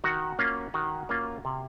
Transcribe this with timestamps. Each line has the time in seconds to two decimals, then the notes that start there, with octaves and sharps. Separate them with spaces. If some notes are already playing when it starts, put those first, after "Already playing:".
0.04 D#3 F#4
0.39 A#3 C#4 F4
0.74 D#3 F#4
1.09 A#3 C#4 F4
1.45 C3